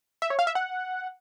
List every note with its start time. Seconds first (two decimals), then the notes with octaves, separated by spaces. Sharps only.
0.22 E5
0.30 C#5
0.39 F5
0.47 E5
0.55 F#5